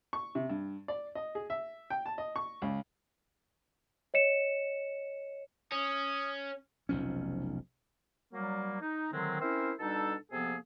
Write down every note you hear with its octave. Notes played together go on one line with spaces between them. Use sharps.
C#6
C3
G2
D5
D#5
G#4
E5
G5
A5
D#5
C#6
C#2
C#5 D#5 C#7 E7
C#4 D#6
F1 B1 F3 C#4
F#3 G3 A#3
D#4
A2 D3 D#3 F#3 G#3 C4
C4 C#4 E4 A#4 C5 E5
B2 G3 D4 D#4 A4
C3 F3 A#3 B3 G#4 A4